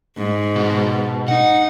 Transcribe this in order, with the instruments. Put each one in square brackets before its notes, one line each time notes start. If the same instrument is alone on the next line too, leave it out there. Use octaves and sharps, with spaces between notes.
[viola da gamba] G#2
[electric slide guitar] B2
[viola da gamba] D#4 [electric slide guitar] F#5